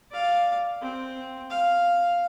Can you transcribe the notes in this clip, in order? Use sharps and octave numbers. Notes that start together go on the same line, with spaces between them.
D5 F5
C4
F5